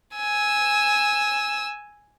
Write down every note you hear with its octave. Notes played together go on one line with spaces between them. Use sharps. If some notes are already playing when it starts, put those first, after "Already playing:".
G#5 E6